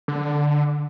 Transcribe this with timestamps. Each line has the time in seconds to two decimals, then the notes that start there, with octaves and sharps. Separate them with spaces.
0.08 D3